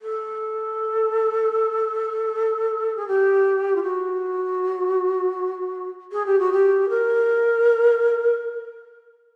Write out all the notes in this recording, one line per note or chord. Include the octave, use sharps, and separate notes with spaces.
A4
G#4
G4
F4
F#4
G#4
G4
F#4
G4
A#4